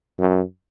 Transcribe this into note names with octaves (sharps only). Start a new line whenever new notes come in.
F#2